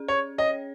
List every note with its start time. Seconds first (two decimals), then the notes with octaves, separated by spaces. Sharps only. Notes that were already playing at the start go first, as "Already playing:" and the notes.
Already playing: C#4 G#4
0.08 C#5
0.38 C#5 D#5